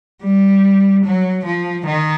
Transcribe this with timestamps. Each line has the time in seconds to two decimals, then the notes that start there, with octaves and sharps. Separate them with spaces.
0.23 G3
1.05 F#3
1.45 F3
1.86 D#3